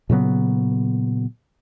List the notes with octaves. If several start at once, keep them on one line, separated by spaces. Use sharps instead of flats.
A#2 C#3 F#3 B3